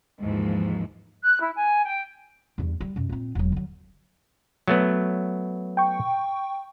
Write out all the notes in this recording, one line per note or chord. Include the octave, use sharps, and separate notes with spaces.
D#2 G#2 E3 F3
F#6
E4
G#5
G5
E2 G2
G3
F#2 B2
A#2 C4
E1 F#3
D3 F#3
F#3 A3 B3
G5 C#6